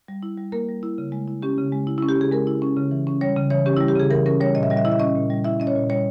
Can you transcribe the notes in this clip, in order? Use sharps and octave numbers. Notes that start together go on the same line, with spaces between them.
G3
E4
G3
A#3 A#4
G3
E4
C#3
G#3
E4
C#4 G4
C#3
G#3
E4
C#4 E4
G4
C#3 G#4
G#3 A#4
E4
C#4
C#3
E3
C#4
G3 C#5
C#3
E3 C#5
C#4 G4
E4
G3
G4
C#3 G#4
E3 A#4
C#4 A#4
G3 C#5
A#2 D#5
E5
G3 D#5
E5
E4 D#5
E5
C#4 D#5
A#2
G3
E4 E5
C#4 D#5
C#5
A#2
G3 C#5